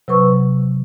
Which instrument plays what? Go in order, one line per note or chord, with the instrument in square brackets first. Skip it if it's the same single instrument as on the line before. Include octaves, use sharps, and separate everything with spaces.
[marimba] C3 F#3 B4 C#6 E6